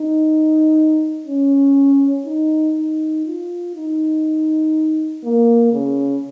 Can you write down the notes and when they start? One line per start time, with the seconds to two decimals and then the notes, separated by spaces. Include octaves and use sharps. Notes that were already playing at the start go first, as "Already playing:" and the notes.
Already playing: D#4
1.27 C#4
2.26 D#4
2.76 D#4
3.26 F4
3.75 D#4
5.24 A#3
5.72 C#3